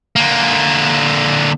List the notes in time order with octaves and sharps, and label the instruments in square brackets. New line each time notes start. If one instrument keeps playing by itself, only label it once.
[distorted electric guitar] D3 A#3